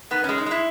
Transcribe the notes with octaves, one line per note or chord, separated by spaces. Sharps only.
D#3 B3
G#3 C#4
D#4
G#3 E4